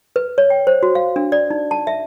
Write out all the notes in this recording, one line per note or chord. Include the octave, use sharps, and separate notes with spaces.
B4
C#5
G5
C5
F#4
F5
D4
D5
D#4
A5
E5